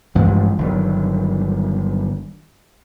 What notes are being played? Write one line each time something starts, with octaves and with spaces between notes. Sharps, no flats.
A1 G2 F3 G#3
G1 D#3 F#3 G3